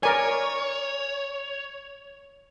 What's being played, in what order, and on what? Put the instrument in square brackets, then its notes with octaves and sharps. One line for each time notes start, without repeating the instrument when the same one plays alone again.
[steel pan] A#4 D5 G#5 [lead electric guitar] C#5